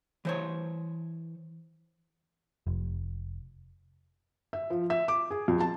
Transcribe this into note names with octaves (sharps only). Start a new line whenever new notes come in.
E3 C5 C#5
F1
E5
F3
E5
D6
G#4
F2
A5